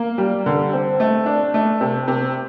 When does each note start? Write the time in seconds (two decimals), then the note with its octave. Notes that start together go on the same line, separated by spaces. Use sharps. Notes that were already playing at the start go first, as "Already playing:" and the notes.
Already playing: A#3
0.18 G3
0.46 D3
0.73 C4
1.00 A3
1.26 D4
1.54 A3
1.81 C3
2.08 C3